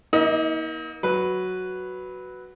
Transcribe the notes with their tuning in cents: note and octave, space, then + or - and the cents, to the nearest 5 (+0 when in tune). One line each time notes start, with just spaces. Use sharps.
A#3 +30 D#4 +45 D#5 +0
F#3 +0 B4 +0